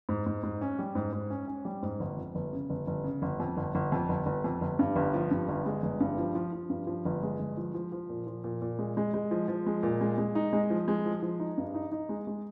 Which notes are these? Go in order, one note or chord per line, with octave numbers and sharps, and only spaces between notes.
G#2
G#2
G#2
C#4
G3
G#2
G#2
C#4
C#4
G3
G#2
G1
F2
G1
C#3
G1
G1
C#3
G1
F2
G1
G1
F2
G1
G1
F2
G1
G2
G1
F3
G2
G1
G#3
G1
G2
F3
F3
F3
G2
F3
G1
G#3
G1
F3
F3
F3
A#2
F3
A#2
A#2
G#3
G#3
G#3
F3
F3
G#3
A#2
G#3
G#3
D#4
G#3
F3
G#3
F3
F3
D#4
G2
D#4
D#4
G#3
G#3